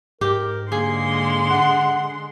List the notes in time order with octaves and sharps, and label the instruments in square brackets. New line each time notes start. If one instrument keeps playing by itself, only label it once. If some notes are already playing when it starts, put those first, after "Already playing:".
[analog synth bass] G#2 [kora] G4 [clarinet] A#4
[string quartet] D3 G#3 C6 [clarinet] A#3 [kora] G#4
[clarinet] F#5